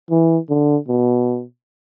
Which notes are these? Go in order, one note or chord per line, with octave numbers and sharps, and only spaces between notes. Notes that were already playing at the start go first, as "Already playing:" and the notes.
E3
D3
B2